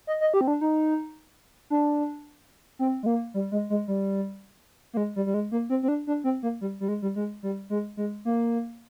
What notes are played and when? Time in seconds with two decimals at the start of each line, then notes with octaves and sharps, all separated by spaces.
0.07 D#5
0.21 D#5
0.34 G4
0.41 C4
0.48 D4
0.61 D#4
1.70 D4
2.79 C4
3.03 G#3
3.06 A#3
3.34 G3
3.52 G#3
3.70 G#3
3.88 G3
4.93 A#3
4.97 G#3
5.16 G3
5.26 G3
5.34 G#3
5.52 A#3
5.70 C4
5.83 C4
5.88 D4
6.07 D4
6.24 C4
6.43 A#3
6.61 G3
6.80 G3
6.88 G#3
7.02 G3
7.16 G#3
7.43 G3
7.70 G#3
7.97 G#3
8.25 A#3